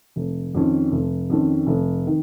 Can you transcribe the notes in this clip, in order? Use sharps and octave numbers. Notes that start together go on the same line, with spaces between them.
F1
F2 D#3 C#4
F1
F2 D#3 C#4
F1
D#3